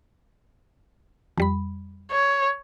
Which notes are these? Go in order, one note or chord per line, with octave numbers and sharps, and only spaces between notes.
F2 G3 B5
C#5